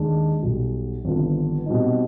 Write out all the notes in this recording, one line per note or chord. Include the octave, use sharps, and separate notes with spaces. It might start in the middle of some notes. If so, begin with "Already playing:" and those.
Already playing: D#2 D#3 G#3 D4
B1 B2 G3
G#1 G2 D3 F3 B3
B2 G3 C4 D#4